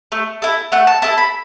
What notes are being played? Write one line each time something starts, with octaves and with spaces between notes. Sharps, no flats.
A3
E4 A4
A3 F#5
A5
E4 A4 A5
B5